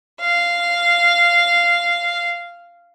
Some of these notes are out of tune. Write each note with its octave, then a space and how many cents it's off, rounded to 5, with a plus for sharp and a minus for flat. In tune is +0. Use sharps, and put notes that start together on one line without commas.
F5 -10